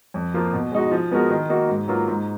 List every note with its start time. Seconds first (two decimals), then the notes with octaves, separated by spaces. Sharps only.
0.14 F2
0.34 F3 A#3 F4
0.53 B2
0.72 G#3 D#4 F#4
0.91 F3
1.11 G#3 B3 F#4 A#4
1.31 D#3
1.49 A#3 D#4 F#4
1.69 G#2
1.88 F#3 A#3 F4 B4
2.08 G#2